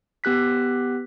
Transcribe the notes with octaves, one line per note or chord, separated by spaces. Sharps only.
B3 G4 F#6 B6